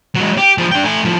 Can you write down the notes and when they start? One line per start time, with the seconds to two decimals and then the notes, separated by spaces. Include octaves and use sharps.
0.15 F#3 G#3
0.38 G4
0.58 F3 G#4
0.72 D4 G5
0.84 A3 G#5
1.05 A2 F3